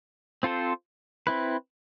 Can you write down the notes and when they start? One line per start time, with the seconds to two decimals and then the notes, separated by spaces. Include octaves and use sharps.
0.43 C4 F4 A4 C5
1.27 C4 E4 B4